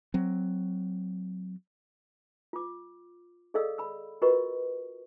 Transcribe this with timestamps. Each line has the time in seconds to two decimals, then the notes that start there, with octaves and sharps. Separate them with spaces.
0.14 F#3 C4
2.53 F4 D6
3.54 G#4 A4 D5 D#5 F5 E6
3.78 B5 E6
4.22 F4 F#4 A#4 B4 D#5 C#6